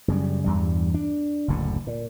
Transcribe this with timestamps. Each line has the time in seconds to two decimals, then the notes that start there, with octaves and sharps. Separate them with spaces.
0.08 F#2 C#3 G3
0.44 E2 G2 G3
0.94 D4
1.48 F#1 D2 A2 D3
1.87 A#2